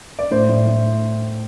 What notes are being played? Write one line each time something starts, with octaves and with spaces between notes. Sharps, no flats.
D5
A2 C5
A2
A2